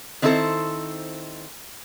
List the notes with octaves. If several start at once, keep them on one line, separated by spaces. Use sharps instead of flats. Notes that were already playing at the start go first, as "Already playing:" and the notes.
D#3 C4 D4 E4 A4 C5